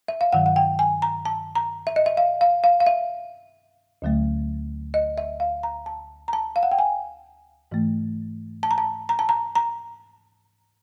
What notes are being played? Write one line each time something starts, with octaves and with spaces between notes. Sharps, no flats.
E5
F5
G2 D#3 F#3 F#5
F#5
G5
G#5
A#5
A5
A#5
E5
D#5
E5
F5
F5
F5
F5
E5
D2 D3 F#3 A3
D#5
E5
F5
A#5
A5
A#5
A5
F5
F#5
G5
G#5
G#2 E3 A3
A5
A#5
A5
A#5
A5
A#5
A#5